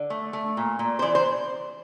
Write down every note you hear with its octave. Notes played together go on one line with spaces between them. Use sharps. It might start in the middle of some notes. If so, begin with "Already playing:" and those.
Already playing: D3
A3
A3
A#2
A#2
C5
E3 D5
C5